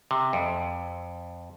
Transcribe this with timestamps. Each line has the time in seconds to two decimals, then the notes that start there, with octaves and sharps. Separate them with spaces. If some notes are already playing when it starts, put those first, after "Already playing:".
0.11 C3
0.33 F2